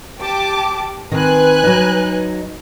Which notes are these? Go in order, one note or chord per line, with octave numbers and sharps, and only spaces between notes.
G4 A5 D6
D#3 C4 B4 G#5 F#6
F#3 D#4